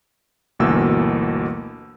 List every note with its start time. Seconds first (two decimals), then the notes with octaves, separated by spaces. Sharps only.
0.59 G1 D2 B2 E3 A#3 E6